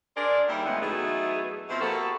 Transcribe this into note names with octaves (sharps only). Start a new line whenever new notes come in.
D4 G#4 A#4 C5 D5
D#2 G3 E4 G4
A2 C#3 E3 F3 G#3 B3
E3 F#3 A3 B3 D#4 G#4
B2 F3 C4 E4
A#3 B3 F#4 G4 A4